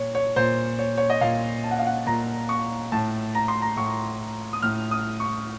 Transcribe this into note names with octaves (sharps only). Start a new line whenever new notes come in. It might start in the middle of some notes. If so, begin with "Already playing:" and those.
Already playing: A#2 C#5
C#5
A#2 C5
C#5
C#5
D#5
A#2 F5
A5
F#5
F5
F#5
A#2 A#5
C#6
A2 A5
A#5
C6
A#5
A2 C#6
D#6
A2 F6
D#6
C#6